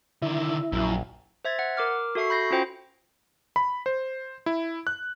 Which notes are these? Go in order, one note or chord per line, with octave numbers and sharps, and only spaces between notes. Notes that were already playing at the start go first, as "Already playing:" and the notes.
D3 D#3 E4
A#1 F#2
C5 E5 G#6 A6
F#5
A#4 D6 F6
F#4 A4 E5 C#6 C7
B5 G6 A#6 C7
C#4 F4 F#4 C5 G5 G6
B5
C5
E4
F#6